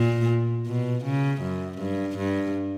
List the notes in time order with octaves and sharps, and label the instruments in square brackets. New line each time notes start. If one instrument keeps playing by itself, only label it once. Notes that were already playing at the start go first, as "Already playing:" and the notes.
Already playing: [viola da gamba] A#2
B2
C#3
F#2
G2
G2